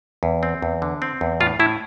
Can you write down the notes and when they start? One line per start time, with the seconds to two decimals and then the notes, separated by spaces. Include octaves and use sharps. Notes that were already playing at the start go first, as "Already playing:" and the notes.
0.23 E2
0.43 C4
0.62 E2
0.82 D3
1.02 C4
1.21 E2
1.40 A2 F4
1.59 A2 E4